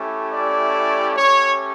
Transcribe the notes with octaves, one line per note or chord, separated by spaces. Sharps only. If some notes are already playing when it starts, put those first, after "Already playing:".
Already playing: A3 C#4 E4 G4
D5
A3 C#4 G4 C#5